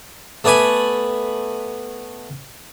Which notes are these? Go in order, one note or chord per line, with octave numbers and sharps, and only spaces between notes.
A3 B3 D5 G#5 B5